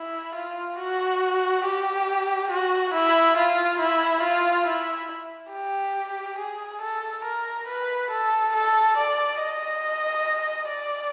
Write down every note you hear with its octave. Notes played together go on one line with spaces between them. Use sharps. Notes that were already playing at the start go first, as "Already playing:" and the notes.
Already playing: E4
F4
F#4
G4
F#4
E4
F4
E4
F4
E4
G4
G#4
A4
A#4
B4
A4
A4
D5
D#5
D5